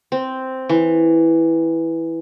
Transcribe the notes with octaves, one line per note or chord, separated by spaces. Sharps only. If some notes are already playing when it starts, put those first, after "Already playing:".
C4
E3